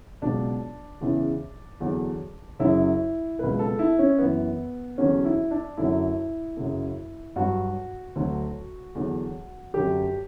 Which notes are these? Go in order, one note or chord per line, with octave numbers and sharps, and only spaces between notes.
C#2 B2 F#3 D4
E2 C#3 E3
E2 D3 F#3
F#2 C#3 F#3 E4
C#2 B2 F#3 B4
A4
E4
C#4
F#2 E3 B3
E2 D3 F#3 C#4
E4
D4
F#2 D3 F#3 E4
F#2 C#3 F#3
G2 F#3 F#4
D2 D3 F#3
E2 D3 F#3
F#2 D3 F#3 G4